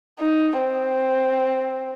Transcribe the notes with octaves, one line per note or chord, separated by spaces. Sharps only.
D#4
C4